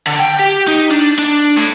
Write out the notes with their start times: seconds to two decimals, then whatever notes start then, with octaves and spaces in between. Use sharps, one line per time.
0.07 D3
0.19 G5
0.39 G4
0.68 D#4
0.91 D4
1.19 D4
1.57 A2